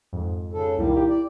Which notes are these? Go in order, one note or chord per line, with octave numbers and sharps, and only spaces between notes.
F2 G#2
C#3 A4
C2 A#2 D#3 G3 A#3 E4
G4
D5